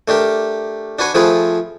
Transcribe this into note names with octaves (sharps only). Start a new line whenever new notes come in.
A3 D4 G4 A#4
D4 F#4 B4 G#5 C#6
F3 A3 C4 F4 G#4 B4